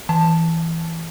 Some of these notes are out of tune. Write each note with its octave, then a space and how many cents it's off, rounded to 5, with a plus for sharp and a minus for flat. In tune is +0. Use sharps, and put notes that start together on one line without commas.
E3 +0 A5 +0